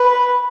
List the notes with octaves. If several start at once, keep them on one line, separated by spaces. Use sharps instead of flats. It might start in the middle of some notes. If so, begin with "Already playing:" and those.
Already playing: B4